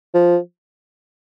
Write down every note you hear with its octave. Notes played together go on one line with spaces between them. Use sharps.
F3